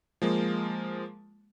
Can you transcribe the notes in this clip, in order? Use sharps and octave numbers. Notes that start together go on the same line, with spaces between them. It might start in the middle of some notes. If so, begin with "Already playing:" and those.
F3 G#3 A#3